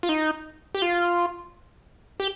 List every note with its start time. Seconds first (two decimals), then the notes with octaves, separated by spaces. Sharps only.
0.03 F4
0.09 D#4
0.75 G4
0.82 F4
2.20 G4